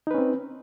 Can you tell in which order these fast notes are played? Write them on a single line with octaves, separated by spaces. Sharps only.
D#4 B4 C#4 C4